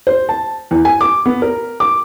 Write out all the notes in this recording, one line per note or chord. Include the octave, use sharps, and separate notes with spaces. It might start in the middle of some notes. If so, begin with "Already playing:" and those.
C5
A5
E2
G#5
D6
B3
A#4
D6